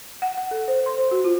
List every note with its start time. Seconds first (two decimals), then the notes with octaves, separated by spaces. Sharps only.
0.22 F#5
0.37 F#5
0.51 A4
0.68 C5
0.86 C6
0.98 C5
1.11 F#4
1.24 F4